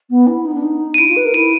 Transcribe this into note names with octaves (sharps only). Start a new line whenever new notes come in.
B3
E4
D#4
D4
D#4
D#7
E4 D7
F4
B4
A#4
E4 D#7